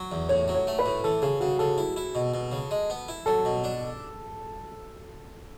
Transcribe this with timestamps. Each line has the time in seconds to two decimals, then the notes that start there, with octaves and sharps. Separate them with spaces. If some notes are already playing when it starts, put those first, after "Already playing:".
Already playing: F#3
0.12 E2
0.29 A2 C#5
0.48 F#3
0.55 C#5
0.67 A3
0.79 B4
0.86 A2
1.04 E3 A4
1.22 C#3 G#4
1.40 C#3 F#4
1.59 C#3 A4
1.78 E4
1.96 E4
2.15 B2
2.34 B2
2.52 C#3
2.71 G#3
2.90 B3
3.08 E4
3.26 F#3 A4
3.45 B2
3.64 D4